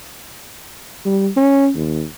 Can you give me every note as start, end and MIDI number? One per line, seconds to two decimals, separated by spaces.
1.05 1.29 55
1.37 1.70 61
1.75 2.04 39